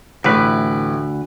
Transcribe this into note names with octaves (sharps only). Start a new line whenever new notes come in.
A1 D2 B4